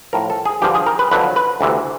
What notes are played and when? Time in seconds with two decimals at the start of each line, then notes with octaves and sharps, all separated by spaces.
0.13 A2 F3 A#4
0.30 A4
0.46 G#4
0.62 G2 D3 F3 G4
0.75 G#4
0.86 A#4
0.99 B4
1.11 F2 D3 F#3 B4
1.36 B4
1.61 D2 C3 E3